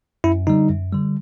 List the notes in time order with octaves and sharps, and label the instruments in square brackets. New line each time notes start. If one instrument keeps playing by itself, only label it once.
[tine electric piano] F#2 E4
D3 G3 D#4
F#2
D3 G3